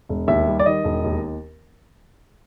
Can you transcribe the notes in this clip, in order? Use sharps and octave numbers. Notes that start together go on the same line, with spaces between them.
E1
D#2 E5
G3
D5
D#3 D#5
E1
D#2